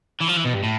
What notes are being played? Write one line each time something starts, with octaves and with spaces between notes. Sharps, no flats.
E3
F3
E3
B2
G2
A2